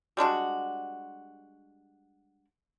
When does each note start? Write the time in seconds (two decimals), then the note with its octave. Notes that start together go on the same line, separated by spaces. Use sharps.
0.17 G3 G#3 D4 F#4